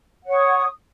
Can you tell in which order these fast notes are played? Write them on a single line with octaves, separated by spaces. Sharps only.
F#5 C#5 C#6 D#6